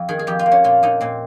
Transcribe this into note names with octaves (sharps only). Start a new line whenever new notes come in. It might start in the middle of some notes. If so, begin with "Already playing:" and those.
Already playing: F2
D#3 G#4
G#4
F2 G4
F4
A#3
C#4
A#2 F4
A#2 D#4
A#2 C4